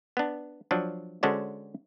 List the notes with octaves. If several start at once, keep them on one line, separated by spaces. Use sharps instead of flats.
B3 D4
F3 F#3 D4
D3 G#3 C#4 D4 F#4 C5